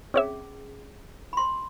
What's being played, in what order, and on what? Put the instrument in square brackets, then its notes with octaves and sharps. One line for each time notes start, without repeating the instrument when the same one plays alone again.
[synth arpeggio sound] C4 C#5 E5 [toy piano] C#4 G#4
[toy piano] B5 C6